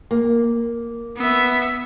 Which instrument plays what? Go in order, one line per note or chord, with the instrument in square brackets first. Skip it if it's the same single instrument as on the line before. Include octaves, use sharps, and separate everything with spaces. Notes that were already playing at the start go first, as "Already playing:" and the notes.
[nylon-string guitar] A#3
[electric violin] B3 E5